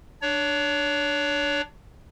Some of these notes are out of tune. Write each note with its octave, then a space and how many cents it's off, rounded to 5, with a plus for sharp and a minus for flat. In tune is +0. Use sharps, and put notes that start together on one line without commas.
D4 +10 C#5 +30